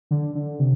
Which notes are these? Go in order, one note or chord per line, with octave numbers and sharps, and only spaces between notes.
D3
D3
C3